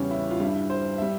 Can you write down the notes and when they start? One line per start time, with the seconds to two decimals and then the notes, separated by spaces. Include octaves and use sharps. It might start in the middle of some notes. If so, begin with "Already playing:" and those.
Already playing: E2 C#3 G3 C#4
0.11 E4
0.30 F4
0.40 G2 G3 E4
0.70 C5
0.98 G3 E5